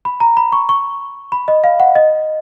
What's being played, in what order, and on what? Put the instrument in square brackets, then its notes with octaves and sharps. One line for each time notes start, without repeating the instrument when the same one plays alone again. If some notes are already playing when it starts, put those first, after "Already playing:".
[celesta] B5
A#5
B5
C#6
C#6
B5
D#5
F5
F#5
D#5